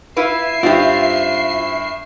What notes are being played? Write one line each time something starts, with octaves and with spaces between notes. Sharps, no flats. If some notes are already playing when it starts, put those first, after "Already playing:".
E4 F4 B4 E5 C7
G2 C4 D#4 F4 G4